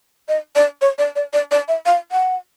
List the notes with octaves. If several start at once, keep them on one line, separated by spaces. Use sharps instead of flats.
D#5
D5
C#5
D5
D5
D5
D5
E5
F5
F#5